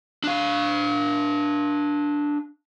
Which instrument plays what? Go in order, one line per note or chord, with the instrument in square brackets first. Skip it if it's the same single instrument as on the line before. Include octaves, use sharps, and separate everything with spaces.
[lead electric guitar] D4 F5